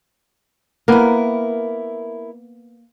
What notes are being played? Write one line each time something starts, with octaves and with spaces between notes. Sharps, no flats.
A#3 B3 E4 A#4